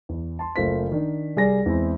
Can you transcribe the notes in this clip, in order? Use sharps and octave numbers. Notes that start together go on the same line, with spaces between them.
E2
A5 C6
F#1 A3 F4 C5 B6
D#3 D4
C2 G3 G#4 D5 A#6
E2 G#3 C4 E4